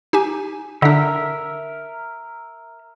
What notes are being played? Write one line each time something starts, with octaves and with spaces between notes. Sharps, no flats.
D#4 G4 G#5
D3 D4 A#4 E5